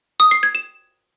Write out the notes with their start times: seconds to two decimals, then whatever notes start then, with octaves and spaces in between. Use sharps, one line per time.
0.20 D#6
0.31 C7
0.43 G#6
0.55 E7